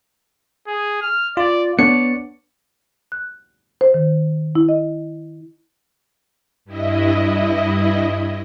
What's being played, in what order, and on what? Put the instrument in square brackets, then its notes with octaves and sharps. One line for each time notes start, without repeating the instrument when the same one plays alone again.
[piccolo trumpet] G#4
F6
[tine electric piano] F4 [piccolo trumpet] D5
[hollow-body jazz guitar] B3 D4 C#5 [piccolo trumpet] D5 [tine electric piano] C#7
[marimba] F#6
C5
D#3
E4
D#5
[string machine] G2 E4 D#5